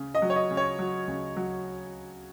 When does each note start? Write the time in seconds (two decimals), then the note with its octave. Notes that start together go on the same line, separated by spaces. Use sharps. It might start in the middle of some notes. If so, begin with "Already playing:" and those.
Already playing: C#3
0.15 D#5
0.22 F#3
0.30 C#5
0.36 D#5
0.51 C#3
0.57 C#5
0.79 F#3
1.08 C#3
1.37 F#3